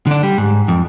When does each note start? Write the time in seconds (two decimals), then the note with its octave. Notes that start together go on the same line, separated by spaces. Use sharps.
0.07 D3 D4
0.23 G3
0.38 G#2
0.68 F2